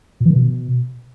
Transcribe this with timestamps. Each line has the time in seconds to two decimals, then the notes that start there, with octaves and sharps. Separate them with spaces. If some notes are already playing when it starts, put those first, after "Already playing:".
0.20 A#2
0.25 E3
0.30 D#3
0.36 B2